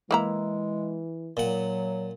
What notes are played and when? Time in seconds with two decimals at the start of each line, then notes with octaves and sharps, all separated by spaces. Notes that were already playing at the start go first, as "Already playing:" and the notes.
0.11 E3 G#3 A#3 E4 A#5
1.37 A#2 F#3 F#5